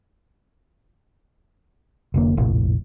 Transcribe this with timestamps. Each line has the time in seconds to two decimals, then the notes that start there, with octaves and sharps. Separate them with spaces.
2.14 F1 D3 A#3
2.37 F1 A#1 F2 A2